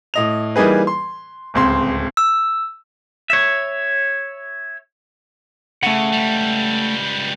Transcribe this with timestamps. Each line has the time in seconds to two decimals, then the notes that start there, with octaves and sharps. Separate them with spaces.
0.14 A2 D#5 F7
0.56 E3 G3 A#3 D#4 G#4 B4
0.87 C6
1.54 D1 C#2 C4 C6
2.17 E6
3.30 C#5 E5
5.83 C#3 A3 F#5
6.13 C#2 G3